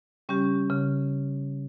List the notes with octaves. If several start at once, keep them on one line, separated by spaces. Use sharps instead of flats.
C#3 G3 C#4 G4
C#3